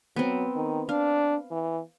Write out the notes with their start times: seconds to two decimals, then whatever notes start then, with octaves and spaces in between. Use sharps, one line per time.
0.16 F#3 B3 C4
0.55 D#3
0.89 D4 F5
1.51 E3